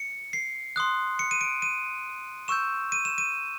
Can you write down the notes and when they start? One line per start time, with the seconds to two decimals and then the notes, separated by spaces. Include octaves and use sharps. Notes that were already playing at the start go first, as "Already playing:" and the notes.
Already playing: C#7
0.33 C7
0.76 C6 D#6 F#6
1.19 C#7
1.31 D#7
1.41 D7
1.62 D#7
2.48 C#6 E6 G6 E7
2.92 D#7
3.05 E7
3.18 D#7